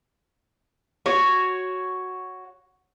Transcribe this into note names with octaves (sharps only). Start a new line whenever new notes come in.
F#4 C#5